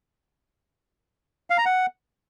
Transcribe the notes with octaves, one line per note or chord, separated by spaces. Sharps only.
F5
A#5
F#5